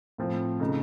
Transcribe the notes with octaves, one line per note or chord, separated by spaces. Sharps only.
A2 F3 C4 F4
C#3 A3 D#4